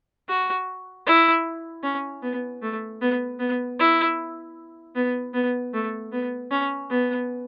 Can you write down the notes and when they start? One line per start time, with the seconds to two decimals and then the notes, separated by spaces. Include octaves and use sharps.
0.28 F#4
1.06 E4
1.84 C#4
2.22 B3
2.62 A3
3.01 B3
3.39 B3
3.79 E4
4.96 B3
5.34 B3
5.74 A3
6.12 B3
6.51 C#4
6.90 B3